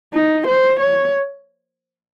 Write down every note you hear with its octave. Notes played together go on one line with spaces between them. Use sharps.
D#4
C5
C#5